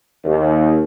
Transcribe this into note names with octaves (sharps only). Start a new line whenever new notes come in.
D#2